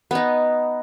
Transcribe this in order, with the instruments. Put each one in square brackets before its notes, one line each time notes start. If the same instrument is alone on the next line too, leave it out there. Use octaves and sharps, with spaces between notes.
[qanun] B3 D#4